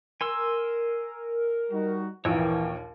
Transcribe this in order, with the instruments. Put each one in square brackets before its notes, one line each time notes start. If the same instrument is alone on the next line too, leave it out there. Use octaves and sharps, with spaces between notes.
[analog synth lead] A#4 [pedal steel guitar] G#5 C6 E6
[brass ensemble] G3 D#4 F#4
[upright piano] A#1 D#2 A#2 [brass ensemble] E3 A#3 [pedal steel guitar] C#5 G5